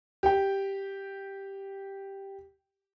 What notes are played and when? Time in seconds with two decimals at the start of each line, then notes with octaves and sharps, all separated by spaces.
0.23 G4 G5